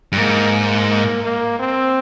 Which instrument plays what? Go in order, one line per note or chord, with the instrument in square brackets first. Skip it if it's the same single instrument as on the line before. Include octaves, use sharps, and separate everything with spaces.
[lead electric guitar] G2
[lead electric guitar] G#2 [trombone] A#3
[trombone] A#3
A#3
A#3
C4